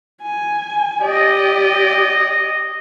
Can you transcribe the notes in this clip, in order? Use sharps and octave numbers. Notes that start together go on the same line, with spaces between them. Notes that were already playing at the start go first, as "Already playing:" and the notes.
G#5
G4 D5 D#5